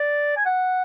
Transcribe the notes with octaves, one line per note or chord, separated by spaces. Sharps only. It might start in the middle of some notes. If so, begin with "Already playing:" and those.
Already playing: D5
G#5
F#5